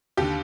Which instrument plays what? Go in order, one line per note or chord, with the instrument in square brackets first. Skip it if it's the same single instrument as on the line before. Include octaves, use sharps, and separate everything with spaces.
[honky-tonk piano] D#2 D3 G4